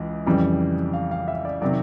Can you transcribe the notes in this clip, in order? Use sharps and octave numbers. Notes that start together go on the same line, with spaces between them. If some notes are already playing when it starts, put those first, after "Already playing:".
Already playing: C#2 E3
F2 C#3 E3 G3
F5
F5
E5
D5
C3 D#3 F#3 D5